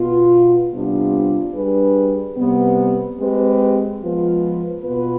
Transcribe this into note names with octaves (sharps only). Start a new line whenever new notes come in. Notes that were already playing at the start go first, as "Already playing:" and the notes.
Already playing: B2 B3 F4
C3 G3 B3 D4 F4
G3 D4 G#4 B4
C3 G3 B3
G#3 C4 G4 B4
F3 G#3 B3 F4 B4
B2 B3 F4 B4